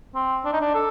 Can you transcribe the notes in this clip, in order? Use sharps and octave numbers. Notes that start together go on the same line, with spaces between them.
C4
D4
D#4
D4
A4